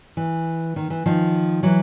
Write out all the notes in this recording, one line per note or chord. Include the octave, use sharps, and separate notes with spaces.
E3
D#3
E3
D#3 F3
E3 F#3